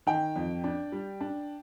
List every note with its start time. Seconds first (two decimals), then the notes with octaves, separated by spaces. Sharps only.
0.07 D#3 G5
0.36 F2
0.64 D4
0.92 G3
1.21 D4